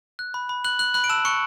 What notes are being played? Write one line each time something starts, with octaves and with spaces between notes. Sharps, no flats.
F#6
B5
B5
F#6 F#7
F#6 F#7
B5 F#6 F#7
D7
A5 E6 E7
C#6 F#6 C#7